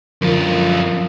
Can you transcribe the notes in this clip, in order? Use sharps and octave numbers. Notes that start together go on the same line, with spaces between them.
F#2 D3 F3 F4 A#4